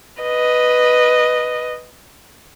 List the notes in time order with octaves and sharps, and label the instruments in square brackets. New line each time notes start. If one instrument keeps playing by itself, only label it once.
[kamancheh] B4 D#5